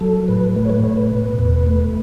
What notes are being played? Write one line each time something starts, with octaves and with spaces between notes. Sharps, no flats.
F#3 A4
A2 B4
A3 B4
C#5
B4
A2 C#5
B4
B2
E2
A3